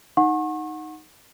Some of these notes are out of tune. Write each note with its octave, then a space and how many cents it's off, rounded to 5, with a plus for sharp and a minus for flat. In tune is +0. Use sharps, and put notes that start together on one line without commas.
D#4 +0 F#5 -15 C#6 -40